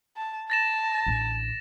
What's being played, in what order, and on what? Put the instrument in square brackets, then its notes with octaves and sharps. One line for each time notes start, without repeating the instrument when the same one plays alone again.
[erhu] A5
[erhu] A5 [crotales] A6 A#6 E7
[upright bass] A1 D3